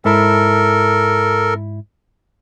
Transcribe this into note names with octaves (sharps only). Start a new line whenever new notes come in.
G#2 E4 A4 A#4 A5